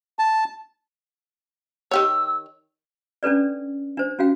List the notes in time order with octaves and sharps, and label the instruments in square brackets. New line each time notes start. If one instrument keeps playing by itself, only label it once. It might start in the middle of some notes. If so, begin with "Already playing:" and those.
[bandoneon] A5
[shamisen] D#3 G4 C#5 [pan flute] E6
[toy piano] C#4 D4 A4 B4 D5
D4 C5
C#4 F#4 F5 G5